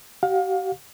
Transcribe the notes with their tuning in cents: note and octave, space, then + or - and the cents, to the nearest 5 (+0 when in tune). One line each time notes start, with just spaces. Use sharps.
G4 -45 F5 +30